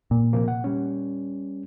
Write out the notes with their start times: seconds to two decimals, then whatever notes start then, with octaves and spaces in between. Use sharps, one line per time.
0.11 A#2
0.33 C3 F3 A#3
0.48 F#5
0.64 G3 C#4